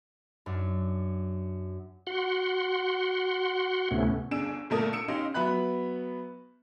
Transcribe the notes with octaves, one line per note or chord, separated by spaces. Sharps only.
F#2 D4
F#4 F#5 C6
D2 A2 C3 A3 B3 C#4
G1 D4 G#4 E6 D7 E7
G1 A#2 A3 A#4 A5 D#6
D#6 E6 C#7 D7 E7
C#4 D#4 G4 D#5 F5 C6
F#3 B3 E5 B5 F#6